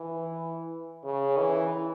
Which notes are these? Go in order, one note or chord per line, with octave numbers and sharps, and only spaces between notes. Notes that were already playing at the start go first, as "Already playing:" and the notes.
Already playing: E3
C#3
E3